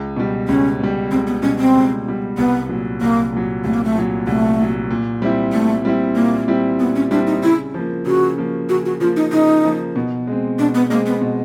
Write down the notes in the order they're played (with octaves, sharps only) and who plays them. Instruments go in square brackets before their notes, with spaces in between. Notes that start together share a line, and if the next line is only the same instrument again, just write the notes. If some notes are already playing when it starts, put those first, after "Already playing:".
Already playing: [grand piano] C#2
B2 G3
[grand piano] C#2 [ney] C#4
[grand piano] B2 G3
[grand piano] C#2 [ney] C4
[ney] B3
[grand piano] B2 G3 [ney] C#4
[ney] C4
[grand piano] C#2
B2 G3
[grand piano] C2 [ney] B3
[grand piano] A#2 F#3
[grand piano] C2 [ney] A#3
[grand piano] A#2 F#3
[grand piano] C2 [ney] A3
[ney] A#3
A3
[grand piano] A#2 F#3
[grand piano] C2 [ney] A3
[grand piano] A#2 F#3
A#2
G3 C4 E4
[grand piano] A#2 [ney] A3
[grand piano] G3 C4 E4
[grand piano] A#2 [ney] A#3
[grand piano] G3 C4 E4
[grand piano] A#2 [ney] B3
[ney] C#4
[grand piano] G3 C4 E4 [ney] D4
[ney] D#4
[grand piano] C#3 [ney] E4
[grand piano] F3 A#3
[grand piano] C#3 [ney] F#4
[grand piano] F3 A#3
[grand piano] C#3 [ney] F#4
[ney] F#4
[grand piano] F3 A#3 [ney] F4
[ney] D#4
[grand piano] C#3 [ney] D#4
[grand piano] F3 A#3
B2
G#3 C4
[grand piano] B2 [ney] D4
[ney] B3
[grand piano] G#3 C4 [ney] A#3
[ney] B3
[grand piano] B2